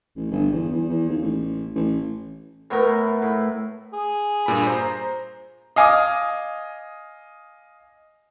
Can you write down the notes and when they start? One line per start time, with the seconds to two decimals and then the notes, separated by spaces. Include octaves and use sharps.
0.16 A1
0.31 G1
0.52 E2
0.72 E2
0.89 E2
1.09 D#2
1.21 A1
1.75 A1
2.70 A2 B3 A#4 C#5
3.22 A2
3.93 G#4
4.46 G2 A#2 B5
4.67 C5 A#5
5.76 D#5 F5 G#5 D6 D#6